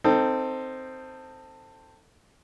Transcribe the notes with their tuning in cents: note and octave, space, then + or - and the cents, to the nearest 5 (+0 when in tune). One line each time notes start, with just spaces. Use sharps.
C4 +0 D#4 +0 A4 +20